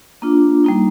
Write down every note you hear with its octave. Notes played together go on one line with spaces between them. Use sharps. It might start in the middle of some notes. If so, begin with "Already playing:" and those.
A#3 D4 F4
G3 A#3 D#4